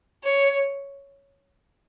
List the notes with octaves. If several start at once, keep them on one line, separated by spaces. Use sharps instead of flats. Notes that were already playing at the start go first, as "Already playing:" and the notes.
C#5